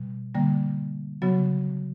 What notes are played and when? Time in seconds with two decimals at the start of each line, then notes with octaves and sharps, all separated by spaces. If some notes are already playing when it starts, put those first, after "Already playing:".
Already playing: B2 G3
0.35 D3 G3 A#3
1.22 C#3 F#3 B3 F#4